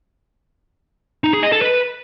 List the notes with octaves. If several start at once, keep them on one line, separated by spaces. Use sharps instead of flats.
D#4
G#4
D#5
A4
B4